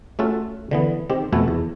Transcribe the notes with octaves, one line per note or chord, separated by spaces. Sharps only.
A3 C#4 F4 F#4 A4 A5
D3 E3 B3
D#3 C4 G4
F2 B2 A3 B3 A4 G#5
E2